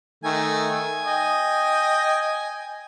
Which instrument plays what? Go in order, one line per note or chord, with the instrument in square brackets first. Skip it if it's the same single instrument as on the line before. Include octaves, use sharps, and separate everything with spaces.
[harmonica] D#3 A3 [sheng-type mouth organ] G#5
[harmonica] D#5 G5